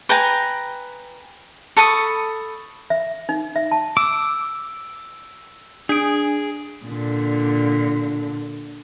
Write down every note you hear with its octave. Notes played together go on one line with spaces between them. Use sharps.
B4 G5 G#5 A#5
A4 B5 C#6 D#6
E5
D#4
E5
A5
D6 E6
D4 G#4 D7
A#2 D3